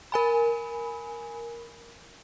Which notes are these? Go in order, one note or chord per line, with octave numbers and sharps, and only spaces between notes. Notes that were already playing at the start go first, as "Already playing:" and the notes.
A#4 G#5 B5